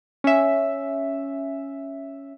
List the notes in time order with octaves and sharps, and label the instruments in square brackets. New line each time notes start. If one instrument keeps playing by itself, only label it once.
[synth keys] C#4 E5